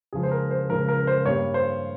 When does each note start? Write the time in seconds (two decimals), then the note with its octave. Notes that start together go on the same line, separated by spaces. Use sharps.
0.13 C#2 C#3 F3 G#4
0.23 C5
0.31 A#4
0.50 C5
0.69 C#2 C#3 F3 A#4
0.88 A#4
1.07 C5
1.25 G2 G3 A#3 C#5
1.54 C5